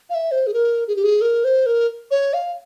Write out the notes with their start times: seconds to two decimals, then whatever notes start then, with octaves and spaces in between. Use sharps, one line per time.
0.10 F5
0.15 E5
0.31 C5
0.47 G#4
0.54 A#4
0.88 G#4
0.96 G4
1.04 G#4
1.21 A#4
1.44 C5
1.66 A#4
2.11 C#5
2.34 F5